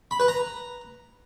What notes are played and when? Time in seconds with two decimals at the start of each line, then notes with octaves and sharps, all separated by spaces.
0.11 B5
0.20 B4
0.28 A#5